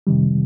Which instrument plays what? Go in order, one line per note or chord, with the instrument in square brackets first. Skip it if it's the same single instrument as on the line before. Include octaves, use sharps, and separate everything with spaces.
[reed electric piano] F2 C3 D#3 G3